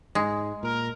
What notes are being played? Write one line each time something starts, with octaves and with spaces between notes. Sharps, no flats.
G#2 G#3
A#2 A#4